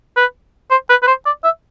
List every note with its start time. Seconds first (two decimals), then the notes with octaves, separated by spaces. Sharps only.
0.17 B4
0.71 C5
0.90 B4
1.03 B4
1.08 C5
1.26 D5
1.44 E5